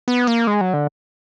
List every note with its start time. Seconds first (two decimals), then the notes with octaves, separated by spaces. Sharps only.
0.08 B3
0.27 A#3
0.47 G#3
0.61 F#3
0.74 D3